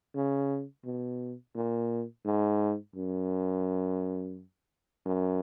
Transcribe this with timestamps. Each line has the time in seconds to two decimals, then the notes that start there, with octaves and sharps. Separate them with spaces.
0.15 C#3
0.85 B2
1.55 A#2
2.25 G#2
2.95 F#2
5.06 F#2